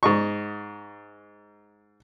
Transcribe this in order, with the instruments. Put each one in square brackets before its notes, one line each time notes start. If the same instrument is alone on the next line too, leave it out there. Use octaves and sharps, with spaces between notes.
[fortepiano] G#2 D#5 C#6